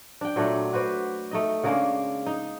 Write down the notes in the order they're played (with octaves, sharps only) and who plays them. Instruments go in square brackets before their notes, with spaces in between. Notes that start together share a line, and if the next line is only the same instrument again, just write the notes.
[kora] D4 G5
A#2 F#3 A3 D4
F#4 B4 C5 D5
A3 D#4 D#5
C#3 G#3 A#3 D4
D#4